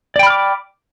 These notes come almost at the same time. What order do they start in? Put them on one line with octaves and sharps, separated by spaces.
D5 G5 B5 F6 D6